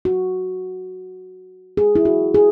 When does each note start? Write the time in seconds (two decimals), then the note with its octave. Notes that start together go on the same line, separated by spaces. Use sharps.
0.05 F#4
1.77 G#4
1.96 E4
2.05 F#4
2.34 G#4